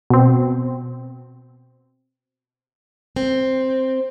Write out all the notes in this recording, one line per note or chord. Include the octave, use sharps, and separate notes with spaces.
B2 C4
C4